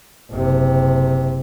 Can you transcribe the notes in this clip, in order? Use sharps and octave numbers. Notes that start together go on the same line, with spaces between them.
F#1 C3